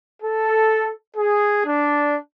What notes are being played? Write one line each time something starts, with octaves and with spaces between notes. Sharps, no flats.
A4
G#4
D4